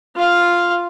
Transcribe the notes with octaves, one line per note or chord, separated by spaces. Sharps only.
F4 F5